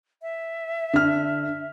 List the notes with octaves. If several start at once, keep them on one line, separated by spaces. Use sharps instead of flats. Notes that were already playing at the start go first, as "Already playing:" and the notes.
E5
D3 F6